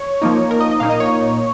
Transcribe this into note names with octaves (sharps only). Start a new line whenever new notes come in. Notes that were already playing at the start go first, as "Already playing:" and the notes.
Already playing: C#5
F3 A#3 D#4
A#4
D#5
D#5
A#2 A#3 D#4 F5
D#5
C#5